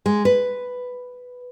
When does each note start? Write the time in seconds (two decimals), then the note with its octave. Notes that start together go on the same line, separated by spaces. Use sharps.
0.06 G#3
0.25 B4